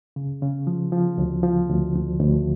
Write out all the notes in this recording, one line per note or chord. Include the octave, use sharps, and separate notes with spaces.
C#3
C#3
F3
F3
D2
F3
D2
D2
D2